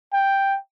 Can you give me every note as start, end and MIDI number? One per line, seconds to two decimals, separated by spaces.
0.13 0.56 79